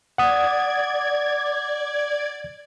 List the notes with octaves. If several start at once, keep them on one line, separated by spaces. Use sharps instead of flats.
D5 F#5 D#6 G#6